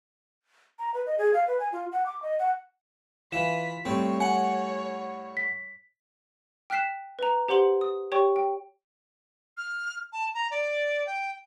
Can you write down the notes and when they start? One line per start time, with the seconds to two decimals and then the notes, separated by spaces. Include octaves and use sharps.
0.79 A#5
0.94 B4
1.06 D#5
1.18 G#4
1.34 F5
1.47 B4
1.60 G#5
1.72 F4
1.92 F#5
2.06 D6
2.22 D#5
2.39 F#5
3.32 E3 F4 F5 B6 E7
3.85 A2 G3 C4 C#5
4.20 F#5 G#5
5.37 B6
6.70 G5 F6 F#6 B6 C7 E7
7.19 B4 A#5
7.48 G4 C5 F#5 C6 F#7
7.81 D#6
8.12 G4 C#5 G5 C#6
8.36 G5
9.57 F6
10.13 A5
10.34 A#5
10.51 D5
11.06 G5